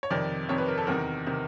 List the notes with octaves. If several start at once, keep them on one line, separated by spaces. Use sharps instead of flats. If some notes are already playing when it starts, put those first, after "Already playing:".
C#5
F2 C3 D#3 D5
F2 C3 D#3 C#5
B4
A#4
A4
E2 C3 D#3 A#4
C3 D#3